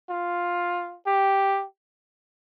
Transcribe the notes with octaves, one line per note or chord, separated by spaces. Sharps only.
F4
G4